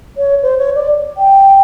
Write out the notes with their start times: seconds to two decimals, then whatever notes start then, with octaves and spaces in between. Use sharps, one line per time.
0.17 C#5
0.43 C5
0.58 C#5
0.75 D5
1.17 G5